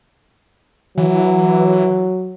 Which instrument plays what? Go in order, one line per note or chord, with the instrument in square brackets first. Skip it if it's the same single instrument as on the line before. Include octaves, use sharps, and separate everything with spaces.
[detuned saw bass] E3 [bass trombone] F#3